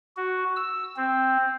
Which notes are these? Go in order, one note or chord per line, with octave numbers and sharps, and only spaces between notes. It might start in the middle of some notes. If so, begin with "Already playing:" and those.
F#4
E6
C4